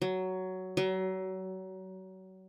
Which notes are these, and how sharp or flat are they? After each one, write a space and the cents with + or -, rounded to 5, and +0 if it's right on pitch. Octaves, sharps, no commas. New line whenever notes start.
F#3 +10
F#3 +30